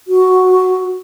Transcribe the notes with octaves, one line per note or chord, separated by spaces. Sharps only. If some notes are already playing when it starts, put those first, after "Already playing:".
F#4